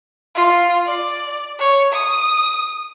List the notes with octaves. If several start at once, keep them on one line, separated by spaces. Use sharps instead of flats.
F4
D5
C#5
D#6